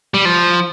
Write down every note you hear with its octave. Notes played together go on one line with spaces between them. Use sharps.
G3
F3